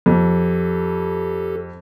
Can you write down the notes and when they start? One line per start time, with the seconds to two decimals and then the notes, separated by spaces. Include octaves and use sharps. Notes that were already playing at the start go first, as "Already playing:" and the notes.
0.06 F2 G4 A4